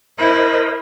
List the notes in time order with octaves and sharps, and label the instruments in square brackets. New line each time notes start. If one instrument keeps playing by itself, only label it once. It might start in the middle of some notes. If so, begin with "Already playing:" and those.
[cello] E4 [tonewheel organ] A#4 C5 D#5